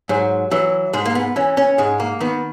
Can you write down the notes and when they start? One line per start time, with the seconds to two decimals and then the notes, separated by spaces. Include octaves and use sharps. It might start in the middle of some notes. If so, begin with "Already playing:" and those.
0.09 G#2 F#3
0.51 E3 F#3
0.93 G#2 G#3
1.05 A#3
1.15 B3
1.36 E3 C#4
1.57 C#4
1.78 G#2 G#3
2.00 A#3
2.20 D#3 B3